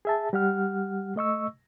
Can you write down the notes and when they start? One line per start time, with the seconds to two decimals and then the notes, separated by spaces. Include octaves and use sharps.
0.05 G#4 E5 A5
0.33 G3 G4 F#5 F6
1.16 A3 D#5 C#6 E6